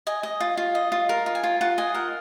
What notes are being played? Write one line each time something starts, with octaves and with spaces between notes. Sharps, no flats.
D#5 G#5
D#5
F4
F4
D#5
F4
A#4 A#5
F4
G#5
F4
F4 F#5
D#5 G#5
A#4 F#5